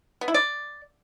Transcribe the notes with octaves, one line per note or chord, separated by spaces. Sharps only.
B3
E4
D5